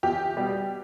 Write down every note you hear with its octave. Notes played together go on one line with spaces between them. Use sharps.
E2 G4
B2 G3